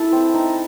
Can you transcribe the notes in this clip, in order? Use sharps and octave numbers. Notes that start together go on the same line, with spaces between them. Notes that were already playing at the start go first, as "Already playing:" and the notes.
Already playing: E4 A4 E5
C4
D#4